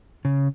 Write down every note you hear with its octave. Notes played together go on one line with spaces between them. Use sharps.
C#3